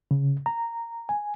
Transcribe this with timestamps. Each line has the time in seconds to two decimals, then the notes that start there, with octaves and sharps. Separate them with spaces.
0.11 C#3
0.46 A#5
1.09 G#5